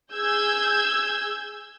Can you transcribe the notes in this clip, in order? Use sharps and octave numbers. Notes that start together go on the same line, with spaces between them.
G#4 E6 G6 G#6